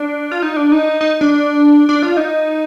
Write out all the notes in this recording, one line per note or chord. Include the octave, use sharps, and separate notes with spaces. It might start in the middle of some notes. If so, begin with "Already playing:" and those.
Already playing: D4
F4
D#4
D4
D#4
D#4
D4
D4
F4
D#4